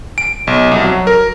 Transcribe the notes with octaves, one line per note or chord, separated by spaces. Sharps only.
D7
B1
C2
F#3
A#4